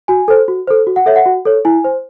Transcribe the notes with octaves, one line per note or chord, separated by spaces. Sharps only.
F#4 G#5
A4 C5
F#4
A4 C5
F#4
F#5
A4 C#5 E5
F#5
F#4
A4 C#5
E4 G#5
C5